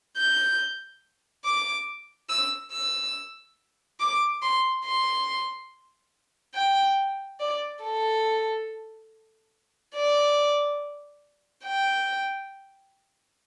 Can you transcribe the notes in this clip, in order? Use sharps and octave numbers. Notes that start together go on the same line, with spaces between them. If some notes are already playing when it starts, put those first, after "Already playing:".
G6
D6
E6
E6
D6
C6
C6
G5
D5
A4
D5
G5